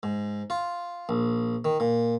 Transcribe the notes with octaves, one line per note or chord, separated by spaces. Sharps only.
G#2
F4
A#1
D#3
A#2